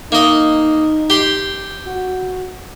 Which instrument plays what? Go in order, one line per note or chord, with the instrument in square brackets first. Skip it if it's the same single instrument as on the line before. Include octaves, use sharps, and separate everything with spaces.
[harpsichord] A#3 D#5 [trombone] D#4
[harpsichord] G4 C6
[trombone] F#4